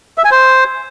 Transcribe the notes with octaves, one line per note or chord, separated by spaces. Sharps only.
E5
G#5
C5